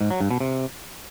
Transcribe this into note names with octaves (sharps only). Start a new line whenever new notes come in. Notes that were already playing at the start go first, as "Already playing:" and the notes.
G#2
F#3
G2
B2
C3